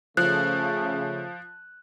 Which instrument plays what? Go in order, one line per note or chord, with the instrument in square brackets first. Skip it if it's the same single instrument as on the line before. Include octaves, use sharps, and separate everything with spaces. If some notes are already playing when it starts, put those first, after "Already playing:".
[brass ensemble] C#3 A3 [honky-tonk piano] F3 [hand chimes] F#6